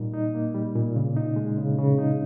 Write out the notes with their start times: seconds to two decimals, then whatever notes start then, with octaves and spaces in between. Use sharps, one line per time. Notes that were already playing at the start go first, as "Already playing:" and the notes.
Already playing: A#2 G3 A#3 D#4
0.13 D#4
0.35 A#3
0.54 G3
0.76 A#2
0.96 C#3
1.17 D#4
1.36 G#3
1.57 C#3
1.78 C#3
1.98 D#4